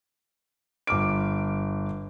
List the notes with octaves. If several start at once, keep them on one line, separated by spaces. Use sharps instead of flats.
G1 D6 F6 D7